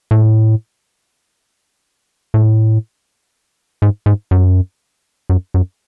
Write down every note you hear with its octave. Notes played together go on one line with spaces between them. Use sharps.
A2
A2
G#2
G#2
F#2
F#2
F#2